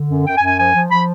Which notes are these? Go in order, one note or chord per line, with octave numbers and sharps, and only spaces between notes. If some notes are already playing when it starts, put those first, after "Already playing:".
Already playing: D3
F#2
F#2 G5
G#5
F#2
G#5
F3 G#5
F3
F3 B5